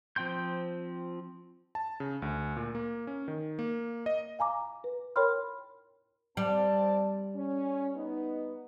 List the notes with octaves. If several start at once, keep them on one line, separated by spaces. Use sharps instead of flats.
F3 C4 G5 C6 G6
A5
C#3
D2
A#2
A#3
C#4
D#3
A#3
D#5
F5 G#5 A#5 D6
B4
A#4 C#5 G5 B5 C6 F6
G3 C4 D5 A5
C#4
B3 D#4